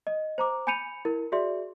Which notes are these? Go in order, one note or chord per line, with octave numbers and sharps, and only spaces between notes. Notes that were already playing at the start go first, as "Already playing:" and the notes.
D#5
C5 A#5 D6
G#5 B5 G6 C#7 D#7 F7
E4 A#4
F#4 G#4 D5 E5 C6